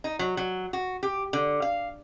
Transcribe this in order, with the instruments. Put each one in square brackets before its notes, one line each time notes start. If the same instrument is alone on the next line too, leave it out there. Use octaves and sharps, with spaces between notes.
[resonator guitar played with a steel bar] D#4
F#3
F#3
F#4
G4
D3
F5